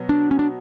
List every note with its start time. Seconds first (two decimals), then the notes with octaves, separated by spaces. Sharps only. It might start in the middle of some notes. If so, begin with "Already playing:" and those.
Already playing: B2 F#3 B3
0.09 D4
0.31 C#4
0.39 D4